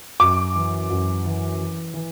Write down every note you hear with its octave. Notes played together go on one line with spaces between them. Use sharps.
F#2 D6
E3
F#2
E3
E3
E3